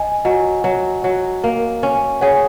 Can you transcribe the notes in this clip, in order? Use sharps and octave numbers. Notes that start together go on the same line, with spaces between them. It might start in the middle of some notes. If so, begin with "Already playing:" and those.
Already playing: D#5 G#5
F#3 D#5 G#5
F#3
F#3
A#3
C#4
G#4 C#5 F#5